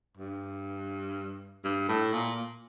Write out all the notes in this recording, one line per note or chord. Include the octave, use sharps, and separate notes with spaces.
G2
G2
A2
A#2